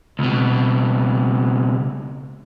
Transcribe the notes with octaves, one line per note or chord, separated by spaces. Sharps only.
C#2 B2